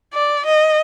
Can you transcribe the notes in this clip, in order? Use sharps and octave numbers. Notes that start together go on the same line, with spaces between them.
D5
D#5